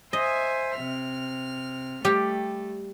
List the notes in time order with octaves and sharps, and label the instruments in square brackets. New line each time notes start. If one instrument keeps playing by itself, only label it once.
[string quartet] C5 E5 G#5 [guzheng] D#5
[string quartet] C3 F6
[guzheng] G3 G4 [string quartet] A3